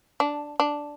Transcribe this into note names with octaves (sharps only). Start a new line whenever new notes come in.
D4
D4